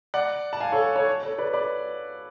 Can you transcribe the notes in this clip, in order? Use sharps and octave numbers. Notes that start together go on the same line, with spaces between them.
D5 F#5
A5
F5 G#5
A4 C#5
A4 C#5
A4 C#5
B4 D5
B4 D5